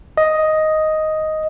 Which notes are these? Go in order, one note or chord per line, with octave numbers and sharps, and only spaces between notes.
D#5